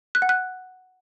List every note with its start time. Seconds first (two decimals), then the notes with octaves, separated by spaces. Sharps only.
0.15 F#6
0.22 F#5
0.29 F#6